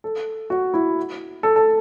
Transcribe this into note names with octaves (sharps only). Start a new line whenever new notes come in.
A4
F#4
E4
A4
A4